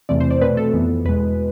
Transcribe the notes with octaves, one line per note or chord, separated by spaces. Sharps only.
E2 C3 E3 A3 C4 D5
C5
D5
B2 A3 C4 B4
A4
F2 E3 B3
E2 B2 G#3 B4